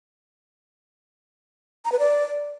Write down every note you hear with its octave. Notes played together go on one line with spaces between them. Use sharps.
A#5
B4
D5